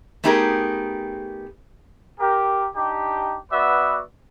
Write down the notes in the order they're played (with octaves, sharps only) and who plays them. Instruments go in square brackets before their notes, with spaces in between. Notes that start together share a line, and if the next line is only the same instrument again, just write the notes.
[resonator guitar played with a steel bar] A3 B3 D#4 G4 G#4 A#4
[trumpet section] G4 A#4
D4 D#4 G4
B3 F#4 B4 D5 E5